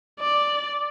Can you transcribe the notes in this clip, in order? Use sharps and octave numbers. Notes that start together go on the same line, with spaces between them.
D5